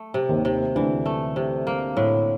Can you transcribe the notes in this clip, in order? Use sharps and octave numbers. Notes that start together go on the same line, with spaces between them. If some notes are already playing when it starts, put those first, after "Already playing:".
Already playing: A3
C3
D#2 D#3
C3
D2 D3 E3
A3
C3
A#3
A2